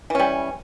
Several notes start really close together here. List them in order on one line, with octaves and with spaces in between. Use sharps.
E3 C#4 G3